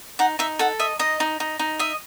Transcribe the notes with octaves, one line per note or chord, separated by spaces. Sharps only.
D#4 F#5
D#4 E5
A4 F#5
D#5 E5
D#4 D#5
D#4
D#4
D#4
D#5 E5